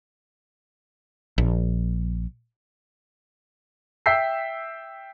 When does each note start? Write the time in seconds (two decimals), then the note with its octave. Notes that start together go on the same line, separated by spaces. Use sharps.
1.38 A#1
4.06 E5 G5 E6 G6 B6 C7